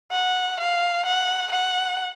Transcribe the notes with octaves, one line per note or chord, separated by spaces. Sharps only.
F#5
F5
F#5
F#5